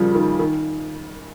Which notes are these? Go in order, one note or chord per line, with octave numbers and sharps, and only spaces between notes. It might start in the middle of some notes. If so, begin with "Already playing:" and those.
Already playing: A#2 C#3 F3 G3
D#3
D#3